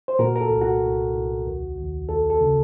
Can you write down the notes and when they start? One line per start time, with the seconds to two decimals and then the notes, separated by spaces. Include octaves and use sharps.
0.08 C5
0.19 A#2 F#4 A#4
0.36 A#4
0.41 A4
0.50 C2
0.61 F#4
0.83 C2
1.14 C2
1.46 D#2
1.77 D#2
2.09 D#2 A4
2.30 A4
2.41 C#3